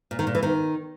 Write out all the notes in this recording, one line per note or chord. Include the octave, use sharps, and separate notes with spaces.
A#2
D#3
A#2
E3
D#3